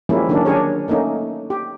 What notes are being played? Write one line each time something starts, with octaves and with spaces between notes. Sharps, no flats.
F3 G3 G#3 A#3 C#4 E4
D3 D#3 F#3 A#3 C#4 D4
D4 G4 G#4 A#4 C#5
A3 A#3 C#4 D#4
G4